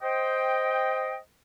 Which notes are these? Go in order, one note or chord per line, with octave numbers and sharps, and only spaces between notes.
C5 D#5 G5